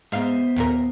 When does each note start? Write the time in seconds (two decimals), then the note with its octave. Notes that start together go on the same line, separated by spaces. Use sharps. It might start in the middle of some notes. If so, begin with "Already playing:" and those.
0.12 G#2 B3 C5 E5 F5
0.57 D#2 A#2 A#4